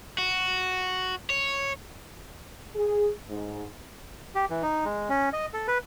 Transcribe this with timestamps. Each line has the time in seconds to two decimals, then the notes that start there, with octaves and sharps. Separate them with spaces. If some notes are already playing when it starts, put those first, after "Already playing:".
0.18 F#4
1.30 C#5
2.75 G#4
3.29 G#2
4.35 G4
4.50 E3
4.62 D#4
4.85 G#3
5.09 C#4
5.33 D#5
5.53 A4
5.68 B4